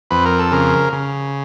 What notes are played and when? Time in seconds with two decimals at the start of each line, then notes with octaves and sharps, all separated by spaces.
0.11 F2 B4
0.25 A#4
0.39 A4
0.52 C#3 A#4
0.93 C#3